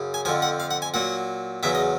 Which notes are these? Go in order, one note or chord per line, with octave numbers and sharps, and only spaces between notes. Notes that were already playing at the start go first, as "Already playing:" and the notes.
Already playing: F#2 C#3
G#5
F2 D3 F3 G#5
F#5
F5
F#5
G#5
A#2 F#3 F#5
E2 C#3 F#3 E5
D#5